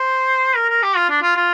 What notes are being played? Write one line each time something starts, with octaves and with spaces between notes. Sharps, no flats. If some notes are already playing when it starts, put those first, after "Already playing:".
Already playing: C5
A#4
A#4
G4
F4
D4
F4
F4